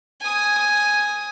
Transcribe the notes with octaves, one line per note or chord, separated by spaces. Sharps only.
G#5 D#6